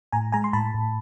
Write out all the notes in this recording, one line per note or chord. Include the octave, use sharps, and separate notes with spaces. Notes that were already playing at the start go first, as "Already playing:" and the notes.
A2 G#5 A#5
G#3 G#5 A#5
C6
A2 A5 B5
A2